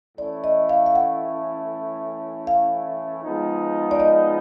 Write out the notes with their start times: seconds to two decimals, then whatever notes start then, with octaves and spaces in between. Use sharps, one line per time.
0.18 A2 E3 A3 C#4 E4 D5
0.44 D#5
0.69 F5
0.86 F5
0.95 F#5
2.47 F5
3.23 F3 G#3 B3 D#4
3.91 D5
4.00 D#5